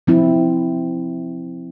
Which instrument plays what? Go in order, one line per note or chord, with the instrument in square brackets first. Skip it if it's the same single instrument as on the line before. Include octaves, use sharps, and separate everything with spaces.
[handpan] F3 C4 E4